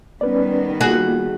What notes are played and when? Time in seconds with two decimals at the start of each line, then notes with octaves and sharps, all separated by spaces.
0.21 D#3 G3 B3 C#4 B4 D5
0.81 A#3 F4 F#4 G#4